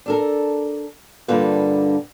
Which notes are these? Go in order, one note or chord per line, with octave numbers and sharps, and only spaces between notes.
D4 A4 A#4
G2 D3 A#3 F4 B4